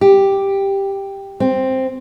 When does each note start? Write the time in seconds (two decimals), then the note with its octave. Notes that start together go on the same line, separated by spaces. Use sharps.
0.01 G4
1.40 C4